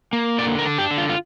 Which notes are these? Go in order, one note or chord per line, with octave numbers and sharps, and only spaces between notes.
A#3
D3 D5
A#4
D4
G4
D3
F4
F4